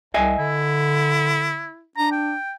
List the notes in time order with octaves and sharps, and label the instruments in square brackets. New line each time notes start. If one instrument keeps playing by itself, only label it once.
[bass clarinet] C2 [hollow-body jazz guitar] D#5 E5 G#5
[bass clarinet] D3 [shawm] E4
[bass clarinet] D4 [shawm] A#5
[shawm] G5